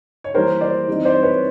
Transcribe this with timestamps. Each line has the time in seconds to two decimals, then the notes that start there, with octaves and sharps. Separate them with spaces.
0.24 C#5
0.34 E3 G3 A#3 A#4 C5
0.61 C5 D5
0.88 E3 G3 C4 D#4
1.05 C5 D5
1.23 B4 C#5